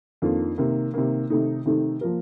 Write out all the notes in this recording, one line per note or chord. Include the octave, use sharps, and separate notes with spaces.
F2 D#3 A#3 D4 F4
C3 D#3 A#3
C3 D#3 A#3
C3 D#3 A3 D#4
C3 D#3 A3 D#4
F3 A#3 F4 A#4